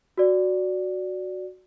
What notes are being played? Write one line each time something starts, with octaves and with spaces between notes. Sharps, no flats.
F#4 D5